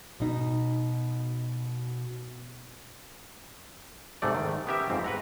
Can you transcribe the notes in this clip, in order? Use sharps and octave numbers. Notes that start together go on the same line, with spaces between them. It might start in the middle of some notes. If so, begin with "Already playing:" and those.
B2 D#4
G#2 C3 A3 D5
D#3
B3 C#4 G4 A#4 E5
F2 G#2 C4
B4 F#5 A#5